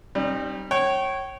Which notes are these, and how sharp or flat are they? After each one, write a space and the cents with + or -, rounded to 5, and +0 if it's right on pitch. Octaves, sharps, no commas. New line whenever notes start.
G3 -15 C4 +30 D#4 -30
C#5 -20 G5 -35